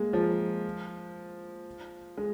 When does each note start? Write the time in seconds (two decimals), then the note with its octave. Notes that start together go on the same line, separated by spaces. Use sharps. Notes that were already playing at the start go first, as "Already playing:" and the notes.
Already playing: G#3 A#3
0.13 F3
2.17 G#3